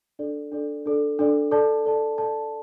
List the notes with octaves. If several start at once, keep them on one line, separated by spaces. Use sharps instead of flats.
D4 A4 D5
D4 A4 D5
D4 A4 D5
D4 A4 D5
A4 D5 A5
A4 D5 A5
A4 D5 A5